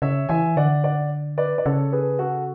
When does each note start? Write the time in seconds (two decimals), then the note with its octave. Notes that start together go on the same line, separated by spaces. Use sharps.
0.02 C#3 C#5 E5
0.29 E3 E5 G#5
0.56 D3 D5 F#5
0.84 D5 F#5
1.38 B4 D5
1.58 D5
1.65 C#3 A4 C#5
1.92 G#4 B4
2.19 F#4 A4